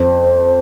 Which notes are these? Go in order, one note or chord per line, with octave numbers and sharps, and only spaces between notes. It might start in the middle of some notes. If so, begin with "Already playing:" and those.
Already playing: F2 C5